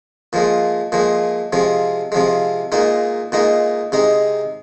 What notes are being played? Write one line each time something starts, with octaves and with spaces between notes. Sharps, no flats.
A#2 F3 G#3
A#2 F3 G#3
C3 F3 G#3
C3 F3 G#3
A#2 G#3 D#4
A#2 G#3 D#4
C3 G#3 D#4